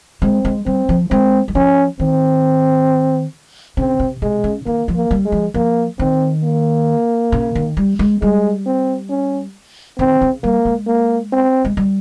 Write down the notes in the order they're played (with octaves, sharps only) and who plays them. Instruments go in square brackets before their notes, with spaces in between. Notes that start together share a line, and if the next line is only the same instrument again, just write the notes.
[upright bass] G#3 [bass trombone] C4
[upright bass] G#3
[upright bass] G3 [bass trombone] C4
[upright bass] F3
[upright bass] G#3 [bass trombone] C4
[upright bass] G3
[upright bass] F3 [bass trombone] C#4
[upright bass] D#3 [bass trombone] C4
[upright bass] C#3 [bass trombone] C4
[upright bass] C3
[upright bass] C3 [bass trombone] G#3
[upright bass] C#3
[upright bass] D#3 [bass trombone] A#3
[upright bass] F3
[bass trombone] A#3
[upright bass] G3
[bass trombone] G#3
[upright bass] F3
[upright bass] F3 [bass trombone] A#3
[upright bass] D#3 [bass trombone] C4
[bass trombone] A#3
[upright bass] C#3
D#3
G3
G#3
[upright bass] G3 [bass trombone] G#3
[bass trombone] C4
C#4
[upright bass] D#3 [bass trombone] C4
[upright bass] C#3
[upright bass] G3 [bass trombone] A#3
[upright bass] G#3
[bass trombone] A#3
C4
[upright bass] G#3
G3